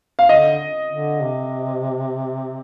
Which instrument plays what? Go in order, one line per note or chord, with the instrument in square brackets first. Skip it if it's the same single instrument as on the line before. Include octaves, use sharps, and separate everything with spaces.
[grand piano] F5
[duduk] D3 [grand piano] D#5
[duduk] D3
C3